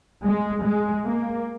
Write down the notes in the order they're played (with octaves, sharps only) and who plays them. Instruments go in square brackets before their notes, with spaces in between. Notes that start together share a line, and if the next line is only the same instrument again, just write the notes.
[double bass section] G#3
G#3
A#3